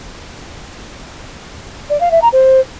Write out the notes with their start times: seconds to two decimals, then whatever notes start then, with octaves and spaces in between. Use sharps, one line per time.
1.90 D5
2.01 F5
2.11 E5
2.22 A#5
2.33 C5